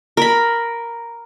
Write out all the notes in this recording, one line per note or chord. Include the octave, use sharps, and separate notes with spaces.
A#4 B5